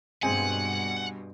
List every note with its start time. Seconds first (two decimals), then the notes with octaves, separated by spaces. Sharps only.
0.23 G2 B2 G#3 C4 F#5 G#5